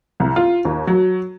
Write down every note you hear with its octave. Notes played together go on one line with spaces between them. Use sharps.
C2
F4
D#2
F#3